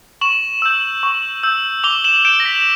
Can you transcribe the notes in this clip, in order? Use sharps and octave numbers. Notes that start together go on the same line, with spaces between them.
C#6 E7 F#7
E6 G6
C#6
E6 G6
D6 F7 G7
E7 F#7
G6 D7 E7
A#6
B6